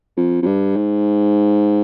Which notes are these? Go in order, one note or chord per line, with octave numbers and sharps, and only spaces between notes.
F2
F2
G2
G#2